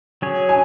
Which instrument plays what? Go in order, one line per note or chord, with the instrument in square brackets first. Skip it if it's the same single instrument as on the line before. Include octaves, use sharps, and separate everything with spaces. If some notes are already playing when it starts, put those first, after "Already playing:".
[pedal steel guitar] F#3 C#4 G#4 C#5
[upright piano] G#5